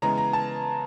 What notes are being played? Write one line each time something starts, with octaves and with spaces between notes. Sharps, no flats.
C#3 E3 G#3 B3 A#5
A#5
A5